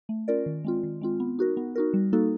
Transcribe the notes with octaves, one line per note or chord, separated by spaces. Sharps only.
A3
C#4 F4 A#4 D5
D#3
G#3 C4 F4
D#3
G#3 C4 F4
B3
D#4 F#4 A#4
B3
D#4 F#4 A#4
G3
A#3 D#4 F#4 A4